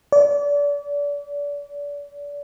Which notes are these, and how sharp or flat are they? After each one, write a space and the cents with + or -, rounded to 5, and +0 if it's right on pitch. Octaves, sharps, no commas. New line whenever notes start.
D5 -35